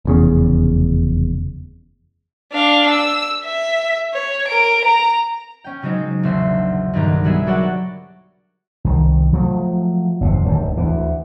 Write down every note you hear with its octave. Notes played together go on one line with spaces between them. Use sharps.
F1 E2 C#3
D4 F5
E6
E5
C#5
A#4 D7
A#5
C#4 G5
C#3 F#3 G#3 C4 D#4
E1 A#1 D3 A3 E5 C6
B1 G2 D3 D#3 A#4 A#5
F#3 G3 B3 G#4 E5
F#4 A4 A#4 C#5 D5 F#5
C2 D#3
F3 F#3 A3
G1 F2 C3
D1 D2 G#2
D2 E3